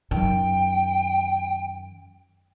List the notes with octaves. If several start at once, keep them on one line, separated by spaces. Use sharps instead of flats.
F#2 D#3 G5